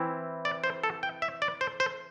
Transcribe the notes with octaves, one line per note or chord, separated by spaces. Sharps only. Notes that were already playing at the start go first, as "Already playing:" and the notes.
Already playing: E3 C4 E4
D5
C5
A4
G5
E5
D5
C5
C5